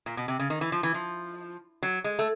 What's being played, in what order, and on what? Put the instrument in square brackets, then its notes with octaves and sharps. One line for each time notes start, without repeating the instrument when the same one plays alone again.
[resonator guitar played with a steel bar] A#2
B2
C3
C#3
D#3
E3
F3
E3
F3
F#3
G#3
A3